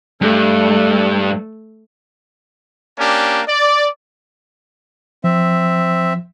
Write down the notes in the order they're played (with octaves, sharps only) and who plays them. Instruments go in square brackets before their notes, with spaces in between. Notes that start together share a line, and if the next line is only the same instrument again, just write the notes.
[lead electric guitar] G2 [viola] A3
[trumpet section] A#3 C#4 D4 G4
D5
[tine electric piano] F3 [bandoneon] C4 E5